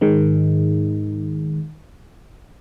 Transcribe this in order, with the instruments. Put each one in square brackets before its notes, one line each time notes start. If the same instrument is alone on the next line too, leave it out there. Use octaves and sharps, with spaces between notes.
[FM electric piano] G#2 D#3 G#3